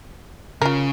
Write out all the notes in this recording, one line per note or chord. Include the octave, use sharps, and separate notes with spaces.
C#3 F4 A#4